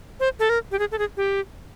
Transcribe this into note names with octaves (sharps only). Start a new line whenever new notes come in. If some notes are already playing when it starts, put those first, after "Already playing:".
C5
A4
A#4
G4
G#4
A4
G#4
G4